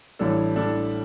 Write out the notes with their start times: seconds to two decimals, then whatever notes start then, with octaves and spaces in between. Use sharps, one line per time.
0.19 A1 A2 G3 D4 A4
0.56 A2 G3 D4 A4